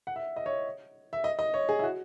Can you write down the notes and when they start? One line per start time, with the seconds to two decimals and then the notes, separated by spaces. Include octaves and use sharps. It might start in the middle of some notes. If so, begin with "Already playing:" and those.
0.07 F#5
0.16 E5
0.36 D#5
0.46 C#5
1.13 E5
1.24 D#5
1.39 D#5
1.54 C#5
1.69 G#4
1.79 E4
1.83 F#4